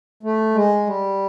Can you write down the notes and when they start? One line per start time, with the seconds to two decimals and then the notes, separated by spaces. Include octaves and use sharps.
0.23 A3
0.55 G#3
0.87 G3